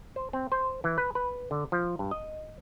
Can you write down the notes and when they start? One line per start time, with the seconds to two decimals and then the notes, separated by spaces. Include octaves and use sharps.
0.16 C5
0.33 C4
0.52 C5
0.84 E3
0.98 B4
1.15 B4
1.51 D3
1.72 F3
1.99 G2
2.11 D#5